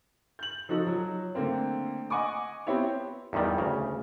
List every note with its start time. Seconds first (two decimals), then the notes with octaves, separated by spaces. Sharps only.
0.39 G6 F#7
0.69 F3 D#4 F#4 A4
0.87 F#3
1.35 D3 A3 A#3 C4
2.10 D#5 F#5 G#5 C#6 D6
2.67 B3 C4 E4 G4 C#5
3.33 E2 G2 A#2 D#3 G3
3.58 D2 C#3